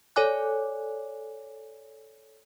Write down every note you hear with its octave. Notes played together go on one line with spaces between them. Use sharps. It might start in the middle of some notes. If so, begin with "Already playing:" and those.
A4 C#5 D5 G#5 D6 F#6